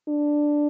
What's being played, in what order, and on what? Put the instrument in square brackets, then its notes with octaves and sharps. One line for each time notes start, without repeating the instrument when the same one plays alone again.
[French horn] D4